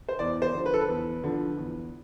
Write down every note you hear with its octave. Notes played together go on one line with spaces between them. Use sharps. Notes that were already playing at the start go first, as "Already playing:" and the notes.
C5
E2 D5
C5
D3 F3
B4
A4
B4
E2
D3 F3
E2